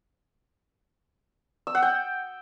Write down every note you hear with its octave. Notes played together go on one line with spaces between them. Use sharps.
E6
F#5
G5